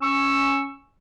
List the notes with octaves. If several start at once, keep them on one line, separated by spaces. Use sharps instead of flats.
C#4 C#6 E6